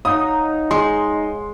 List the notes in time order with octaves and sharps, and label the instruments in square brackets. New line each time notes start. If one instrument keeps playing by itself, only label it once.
[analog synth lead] D#4 [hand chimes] C#5 F5 F#5 [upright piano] D#6
[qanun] G#3 [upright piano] C6